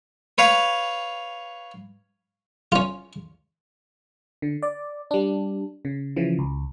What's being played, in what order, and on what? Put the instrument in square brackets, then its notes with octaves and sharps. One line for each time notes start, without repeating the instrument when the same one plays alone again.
[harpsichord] B4 C#5 F5
C#4 F4
[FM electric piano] D3
D5
G3 D4
C#3
C#3 E3 F3
C#2